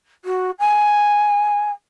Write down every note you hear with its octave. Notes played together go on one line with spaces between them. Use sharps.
F#4
G#5